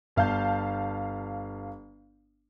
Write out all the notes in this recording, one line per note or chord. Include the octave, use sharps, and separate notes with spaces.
G1 F5 A5 G6